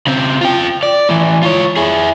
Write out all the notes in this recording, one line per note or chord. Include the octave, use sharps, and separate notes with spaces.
C#3 C4
F4 G5
D5
A2 E3
F4 C#5
E4 G#4